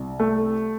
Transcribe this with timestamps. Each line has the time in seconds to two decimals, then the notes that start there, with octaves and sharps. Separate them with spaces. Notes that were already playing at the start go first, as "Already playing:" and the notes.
Already playing: C2
0.20 A3